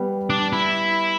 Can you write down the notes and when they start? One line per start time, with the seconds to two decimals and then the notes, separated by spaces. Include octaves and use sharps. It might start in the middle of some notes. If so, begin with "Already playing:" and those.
Already playing: G3 B3
0.30 D4
0.53 E4